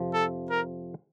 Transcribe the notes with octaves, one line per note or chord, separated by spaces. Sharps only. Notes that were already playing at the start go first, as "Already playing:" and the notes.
Already playing: F2 C3 F3
A4
A#4